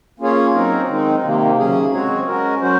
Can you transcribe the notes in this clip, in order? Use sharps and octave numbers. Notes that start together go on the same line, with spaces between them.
A#3 C#4 F4 G#4 C#5
F#3 C4 D#4 A#4
D#3 G#3 C4 D#4
C3 D#3 A#3
C#3 F#3 C#4 G#4
G#3 C4 F#4 C#5
G#3 C#4 F#4 A#4
F#3 C#4 F#4 C5